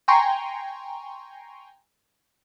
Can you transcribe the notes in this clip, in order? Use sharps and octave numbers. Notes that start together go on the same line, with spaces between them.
G5 G#5 A#5 C6 C#6